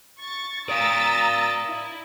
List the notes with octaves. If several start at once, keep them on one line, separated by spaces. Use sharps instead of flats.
C#6 A6
D5 F5 A#5 D#6 E6 A6
E4